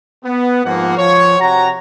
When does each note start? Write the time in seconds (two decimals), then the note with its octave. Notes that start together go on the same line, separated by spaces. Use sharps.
0.24 B3
0.65 G#2 F3 A#3 F#5
0.97 F3 C#5
1.40 C3 F#4 C#5 F#5 A#5